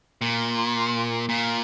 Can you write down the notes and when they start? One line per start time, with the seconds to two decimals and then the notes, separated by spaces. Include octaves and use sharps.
0.22 A#2
1.29 A#2